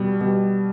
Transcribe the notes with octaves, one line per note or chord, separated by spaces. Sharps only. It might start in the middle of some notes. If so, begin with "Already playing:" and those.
Already playing: B2 G3
B2 G3